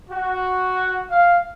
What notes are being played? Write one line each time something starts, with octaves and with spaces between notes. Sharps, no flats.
F#4
F5